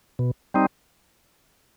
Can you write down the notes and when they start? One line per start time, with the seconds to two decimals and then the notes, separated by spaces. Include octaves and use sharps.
0.19 B2
0.54 G3 C4 D#4